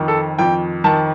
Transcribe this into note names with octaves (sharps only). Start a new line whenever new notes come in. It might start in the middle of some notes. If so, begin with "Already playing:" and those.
Already playing: F2 D#3
A4
F2 G5
D#3 A5